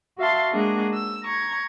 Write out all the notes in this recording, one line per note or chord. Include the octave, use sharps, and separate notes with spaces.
F#4 E5 F5 A5 C6
G#3 A#3 D4 F#4 G#4
E6
A#5 C#6 G#6